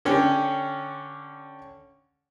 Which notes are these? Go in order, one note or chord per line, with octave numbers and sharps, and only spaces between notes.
D3 C#4 G4